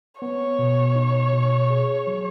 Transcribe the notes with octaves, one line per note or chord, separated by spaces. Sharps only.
B3 C#5
B2
D#4
B2
G#4
F#3